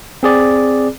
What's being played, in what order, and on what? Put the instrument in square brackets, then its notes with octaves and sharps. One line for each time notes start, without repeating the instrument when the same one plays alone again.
[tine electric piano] C4 G#4 D5